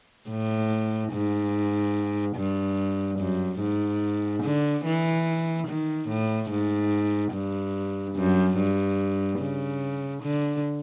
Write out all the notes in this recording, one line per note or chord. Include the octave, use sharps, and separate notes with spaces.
A2
G#2
G2
F#2
G#2
D3
E3
D#3
A2
G#2
G2
F#2
G2
C#3
D3